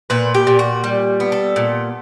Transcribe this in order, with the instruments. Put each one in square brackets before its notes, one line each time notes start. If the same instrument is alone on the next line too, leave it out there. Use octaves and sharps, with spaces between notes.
[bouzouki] A#2 B4
G4
A#2
F#4
G3
B3
A4
A#2